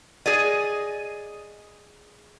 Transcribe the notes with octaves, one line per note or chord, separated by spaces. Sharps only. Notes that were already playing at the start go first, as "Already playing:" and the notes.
G#4 D5 D#5